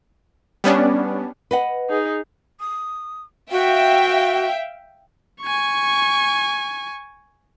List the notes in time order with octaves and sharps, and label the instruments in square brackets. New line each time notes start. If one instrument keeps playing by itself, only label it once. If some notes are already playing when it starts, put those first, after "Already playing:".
[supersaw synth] G3 B3 C#4 D4
[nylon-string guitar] B4 D#5 F#5
[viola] D#4 G#4
[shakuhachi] D#6
[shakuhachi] F#4 [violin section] E5 F5 G5
[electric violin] G#5 C#6